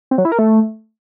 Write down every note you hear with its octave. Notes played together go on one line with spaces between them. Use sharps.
C4
F#3
E4
A#4
A3